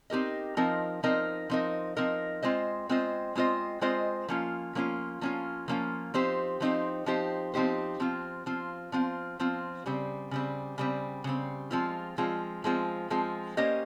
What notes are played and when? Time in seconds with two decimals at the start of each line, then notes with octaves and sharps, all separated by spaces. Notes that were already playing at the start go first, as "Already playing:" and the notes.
0.10 C4 D#4 G4 A#4 D#5
0.57 F3 C4 D#4 A#4 D#5
1.03 F3 C4 D#4 A#4 D#5
1.50 F3 C4 D#4 A#4 D#5
1.97 F3 C4 D#4 A#4 D#5
2.43 G#3 C4 F4 C5 D#5
2.89 G#3 C4 F4 C5 D#5
3.35 G#3 C4 F4 C5 D#5
3.81 G#3 C4 F4 C5 D#5
4.28 F3 A#3 C#4 F4
4.75 F3 A#3 C#4 F4
5.21 F3 A#3 C#4 F4
5.68 F3 A#3 C#4 F4
6.14 F3 C4 D#4 G4 C5
6.61 F3 C4 D#4 G4 C5
7.06 F3 C4 D#4 G4 C5
7.54 F3 C4 D#4 G4 C5
8.00 F3 C4 F4
8.46 F3 C4 F4
8.92 F3 C4 F4
9.40 F3 C4 F4
9.86 C#3 G3 C4
10.31 C#3 G3 C4
10.78 C#3 G3 C4
11.24 C#3 G3 C4
11.71 F3 G#3 C4 F4
12.18 F3 G#3 C4 F4
12.64 F3 G#3 C4 F4
13.10 F3 G#3 C4 F4
13.57 A#3 C#4 G4 C5 D#5